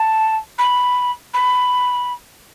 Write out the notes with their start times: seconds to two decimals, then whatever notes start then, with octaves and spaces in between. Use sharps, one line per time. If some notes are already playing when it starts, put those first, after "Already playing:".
Already playing: A5
0.58 B5
1.34 B5